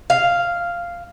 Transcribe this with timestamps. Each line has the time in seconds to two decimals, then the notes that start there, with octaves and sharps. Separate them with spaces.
0.10 F5